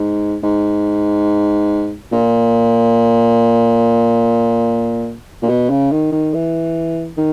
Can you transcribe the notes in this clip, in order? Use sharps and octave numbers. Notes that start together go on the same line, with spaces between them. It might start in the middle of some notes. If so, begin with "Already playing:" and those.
Already playing: G#2
G#2
A#2
A#2
B2
C#3
D#3
D#3
E3
D#3